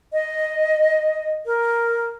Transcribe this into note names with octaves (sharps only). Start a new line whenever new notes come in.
D#5
A#4